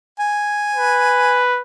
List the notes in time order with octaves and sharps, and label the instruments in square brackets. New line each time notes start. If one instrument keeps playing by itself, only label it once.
[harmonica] G#5
[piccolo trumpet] B4